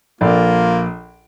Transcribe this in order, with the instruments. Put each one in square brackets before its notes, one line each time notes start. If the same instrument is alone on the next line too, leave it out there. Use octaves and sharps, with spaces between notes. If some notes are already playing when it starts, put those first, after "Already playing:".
[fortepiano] A#1 A4 D5 [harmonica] A#3 F4